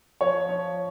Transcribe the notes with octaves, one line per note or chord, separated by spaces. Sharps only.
F3 C#5
F3